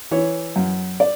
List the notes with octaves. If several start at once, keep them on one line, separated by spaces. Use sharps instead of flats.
E3 C#5
F#2
D5